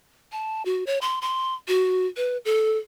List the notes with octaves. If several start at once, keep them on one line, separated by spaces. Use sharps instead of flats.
A5
F#4
C#5
C6
C6
F#4
B4
A4